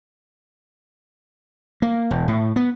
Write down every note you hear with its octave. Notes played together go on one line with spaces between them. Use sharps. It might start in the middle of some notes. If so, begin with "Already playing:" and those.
A#3
E1
A2
B3